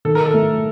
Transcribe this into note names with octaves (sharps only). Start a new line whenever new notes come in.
D#3 A4
A#4
A4
A3